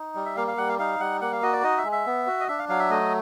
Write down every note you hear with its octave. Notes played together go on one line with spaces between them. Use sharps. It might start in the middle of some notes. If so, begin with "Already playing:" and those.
Already playing: D#4
G3
E5
A#3 F5
F5
G3 F#5
F5
D#4 F5
G3 F#5
A#3 F#5
F5
F#4 D#5
D5
D#4 D#5
E5
G#3
E5
B3
F#4
D#5
D4 E5
F5
F#3 F5
E5
A3 D#5